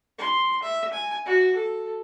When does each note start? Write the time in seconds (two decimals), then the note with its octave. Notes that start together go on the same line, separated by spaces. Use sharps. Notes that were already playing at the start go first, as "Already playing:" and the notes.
0.19 C6
0.62 E5
0.93 G#5
1.25 F#4
1.55 A4